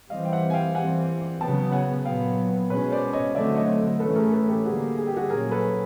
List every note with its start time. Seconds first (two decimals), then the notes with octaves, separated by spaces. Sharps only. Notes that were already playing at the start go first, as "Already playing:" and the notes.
0.10 E3 G3 C4 D#5 F5
0.25 G5
0.32 E5 F#5
0.50 G#5
0.54 F5 G5
0.75 E3 G3 C4 F#5 G#5
1.41 C#3 F#3 B3 G5 A5
1.72 F#5 G#5
2.05 A#2 F#3 B3 F5 G5
2.70 B2 G#3 C#4 B4 C#5
2.92 C5 D5
3.13 C#5 D#5
3.35 D3 F#3 A3 C4 D5 E5
3.57 C#5 D#5
3.99 A2 E3 A3 C#4 A4 B4
4.16 G#4 A#4
4.32 A4 B4
4.48 G4 A4
4.65 D3 G3 A#3 F#4 G#4
4.97 G#4
5.07 G4
5.16 F#4 G#4
5.30 A#2 F#3 A#3 C#4 G#4 A#4
5.51 A4 B4